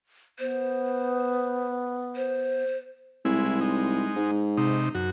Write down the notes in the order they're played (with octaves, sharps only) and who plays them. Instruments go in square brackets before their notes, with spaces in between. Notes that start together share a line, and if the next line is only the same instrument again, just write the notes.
[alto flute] B3 [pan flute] C5
[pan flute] C5
[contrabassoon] C2 [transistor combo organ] G#3 E4
[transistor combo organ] G#3 D#4
[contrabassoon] G#2
[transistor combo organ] C3 D#4
F#2 F#4